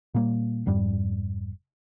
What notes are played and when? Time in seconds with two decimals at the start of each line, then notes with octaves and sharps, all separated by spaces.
0.14 A#2 G3 A#3
0.66 F1 F2 G#2 G3